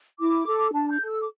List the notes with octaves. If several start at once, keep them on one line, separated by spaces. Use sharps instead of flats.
E4 D6
A4
D4 A5
G6
A4
E6
D6